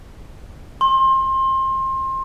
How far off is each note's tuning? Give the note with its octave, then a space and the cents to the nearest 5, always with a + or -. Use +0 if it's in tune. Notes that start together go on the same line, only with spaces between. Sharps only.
C6 +25